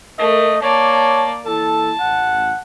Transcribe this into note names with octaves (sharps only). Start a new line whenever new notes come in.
A3 A#4 D#5
A#3 C#5 D5 A5
E3 A#3 E4 A4 A5
A1 F#5